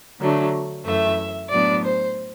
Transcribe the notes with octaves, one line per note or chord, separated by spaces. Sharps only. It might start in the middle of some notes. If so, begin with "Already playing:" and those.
D3 F#3 A3 D4
F#2 E3 A3 E5
A2 F#3 B3 D4 D5
C5